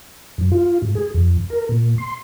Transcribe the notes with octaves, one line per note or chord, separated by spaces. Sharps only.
F#2
F4
G#2
G#4
F2
A#4
A#2
C6